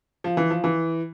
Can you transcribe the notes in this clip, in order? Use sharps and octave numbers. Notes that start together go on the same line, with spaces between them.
F3
E3
F3
E3